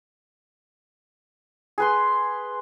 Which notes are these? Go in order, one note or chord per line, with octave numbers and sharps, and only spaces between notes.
G#4 B4 C6